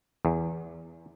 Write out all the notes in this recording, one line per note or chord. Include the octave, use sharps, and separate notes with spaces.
E2